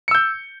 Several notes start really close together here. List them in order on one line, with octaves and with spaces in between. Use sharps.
C#7 E6 G6